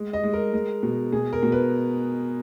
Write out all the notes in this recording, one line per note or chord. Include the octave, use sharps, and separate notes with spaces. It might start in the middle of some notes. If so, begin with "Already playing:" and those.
Already playing: G#3
D#5
G#3
A#4
G#3
B2
B2 G#4
A#4
B2
B4